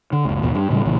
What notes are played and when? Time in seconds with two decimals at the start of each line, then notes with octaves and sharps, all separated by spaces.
0.13 D3
0.25 F#1 C#2
0.43 A1 D#2 B2
0.55 G2
0.70 A2 C#3 F#3 G3
0.85 B1 A#2 C#3 E3